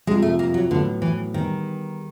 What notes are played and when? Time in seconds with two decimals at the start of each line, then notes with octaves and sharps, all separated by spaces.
0.07 F2 C3 F3 G#3
0.22 A3
0.39 A#3
0.54 F#3
0.70 A2 D3 F#3 B3
1.02 E3
1.33 D#3 G3 B3 D#4 G#4